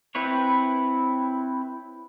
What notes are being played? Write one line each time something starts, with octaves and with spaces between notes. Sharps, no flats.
C4 E4 B4 C#5